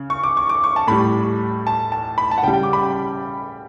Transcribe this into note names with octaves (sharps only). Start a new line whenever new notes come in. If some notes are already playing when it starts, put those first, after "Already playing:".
Already playing: C#3
C#6
D6
C#6
D6
C#6
A5
A2 G3 B5
A5
A5
B5
A5
F#5
C#3 G3 G5
G5
D6
B5
G5